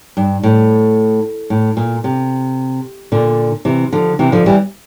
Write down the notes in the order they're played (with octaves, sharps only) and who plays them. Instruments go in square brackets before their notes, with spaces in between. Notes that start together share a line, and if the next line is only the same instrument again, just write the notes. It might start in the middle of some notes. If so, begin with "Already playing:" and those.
[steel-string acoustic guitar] G2
A2
A2
A#2
C3
A#2 D3
C3 E3
D3 F3
C3 E3
D3 F3
E3 G3